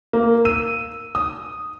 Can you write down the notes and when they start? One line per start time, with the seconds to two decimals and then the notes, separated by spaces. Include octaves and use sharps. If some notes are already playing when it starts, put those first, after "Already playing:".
0.13 A#3
0.45 E6 D#7
1.15 D#6